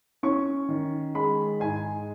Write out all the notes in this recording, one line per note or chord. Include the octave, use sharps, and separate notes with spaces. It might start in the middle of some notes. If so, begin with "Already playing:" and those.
C#4 C#6
D#3
G#3 B5
G#2 G#5